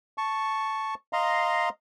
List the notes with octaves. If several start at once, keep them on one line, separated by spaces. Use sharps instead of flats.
A5 C#6
D#5 F5 A#5 C6